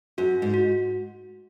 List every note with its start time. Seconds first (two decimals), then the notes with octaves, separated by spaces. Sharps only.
0.18 F#2 F#4
0.42 G#2
0.54 F#4